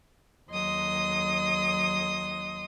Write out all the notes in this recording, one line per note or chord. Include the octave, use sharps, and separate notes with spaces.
D#2 F#3 D#5 C6 D#6